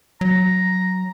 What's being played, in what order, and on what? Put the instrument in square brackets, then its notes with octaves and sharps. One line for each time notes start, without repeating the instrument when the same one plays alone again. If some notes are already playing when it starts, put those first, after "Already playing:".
[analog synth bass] F#3 [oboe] A#5